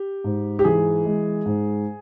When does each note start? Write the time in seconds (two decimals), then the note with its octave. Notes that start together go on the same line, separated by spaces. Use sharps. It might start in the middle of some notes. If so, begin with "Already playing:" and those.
Already playing: G4
0.24 G#2
0.59 G4
0.64 E3 G#4
1.05 G#3
1.46 G#2